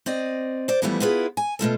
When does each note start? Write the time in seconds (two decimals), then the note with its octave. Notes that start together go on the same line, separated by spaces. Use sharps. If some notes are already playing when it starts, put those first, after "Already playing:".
0.06 C4 D5 D#5
0.68 C5 D5
0.82 E3 F3 G3 A3 B3 E4
1.00 B3 E4 F4 G#4 B4
1.37 G#5
1.59 B2 A3 F4 A4